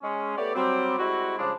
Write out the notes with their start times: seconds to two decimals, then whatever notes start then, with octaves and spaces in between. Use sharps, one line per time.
0.02 G#3 C#4
0.37 A3 B3 G4 C#5 D5
0.54 F#3 G3 C4
0.98 G3 G#3 C4 E4 F#4
1.38 C#3 F3 G3 G#3 D4